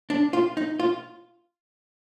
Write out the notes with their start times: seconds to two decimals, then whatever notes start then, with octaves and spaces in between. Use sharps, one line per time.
0.10 D4
0.33 F4
0.57 D#4
0.80 F4